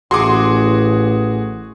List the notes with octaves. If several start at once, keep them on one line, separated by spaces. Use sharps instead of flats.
A1 F#4 G#4 C6 D6